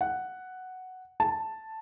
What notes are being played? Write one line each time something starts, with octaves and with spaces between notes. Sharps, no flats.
F#5
A5